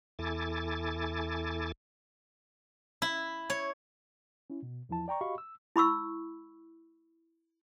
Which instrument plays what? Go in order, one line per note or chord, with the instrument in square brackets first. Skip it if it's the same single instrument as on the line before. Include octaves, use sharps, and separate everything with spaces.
[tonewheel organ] E2 E4 A4 G#5 D6 A6
[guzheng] E4
C#5
[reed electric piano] C#4 E4
B2
E2 F3 E4 A5
D5 G5 A#5 C#6
F#4 G4 D#5 F5 B5 C#6
E6
[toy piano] E4 B5 C#6 E6